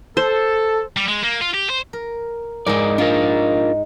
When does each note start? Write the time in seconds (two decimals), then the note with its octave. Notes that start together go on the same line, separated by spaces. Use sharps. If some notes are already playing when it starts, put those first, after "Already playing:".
0.17 A4 C5
0.97 G3
1.08 G#3
1.23 A#3
1.41 F4
1.54 G4
1.70 C5
1.93 A#4
2.66 G#2 G#3 D#4 A#4 D5
2.98 D4 D#4 F4 A#4